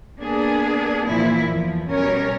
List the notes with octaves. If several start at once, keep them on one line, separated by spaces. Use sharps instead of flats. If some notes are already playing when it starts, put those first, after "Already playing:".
A#3 B3 D4 G#4
A#2 E3 F3 A#3 E4
E2 F3
B2 G3 C#4 A#4 C#5